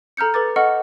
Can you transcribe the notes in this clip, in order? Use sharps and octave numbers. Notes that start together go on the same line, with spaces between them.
A4 A#5 F6 G6 C#7
A4 B4 D6 A6
A4 D#5 F#5 C#6 F6 C#7